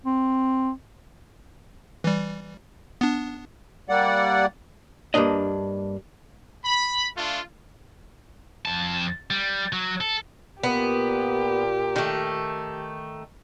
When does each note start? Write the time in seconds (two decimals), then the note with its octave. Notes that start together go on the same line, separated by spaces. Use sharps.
0.06 C4
2.04 E3 G3
3.01 B3 D4
3.89 G3 A#3 D5 F#5
5.14 G2 D#3 A#3 D4 D#5
6.64 B5
7.17 A3 D4 F4
8.66 F2 A5
9.31 G3
9.73 F#3
10.01 A4
10.63 A#2 B3 G4
11.96 D#3 A3